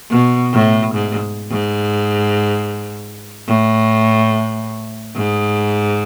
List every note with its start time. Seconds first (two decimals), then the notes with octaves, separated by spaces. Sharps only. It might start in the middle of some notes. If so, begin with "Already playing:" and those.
0.11 B2
0.53 A2
0.95 G#2
1.51 G#2
3.48 A2
5.17 G#2